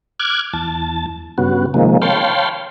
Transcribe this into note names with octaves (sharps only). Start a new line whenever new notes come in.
D6 F6 F#6 G#6
E2 A5
G2 C#3 B3 F#4
C3 D#3 F3 G#3 A#3
C#5 F5 G5 A5 B5 C6